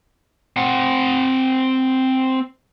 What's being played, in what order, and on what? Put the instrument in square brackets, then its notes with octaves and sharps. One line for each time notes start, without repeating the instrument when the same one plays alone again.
[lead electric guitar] C4 F#5